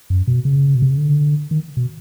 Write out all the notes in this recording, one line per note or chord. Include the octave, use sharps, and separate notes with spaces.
F#2
B2
C#3
B2
C3
C#3
D3
D#3
B2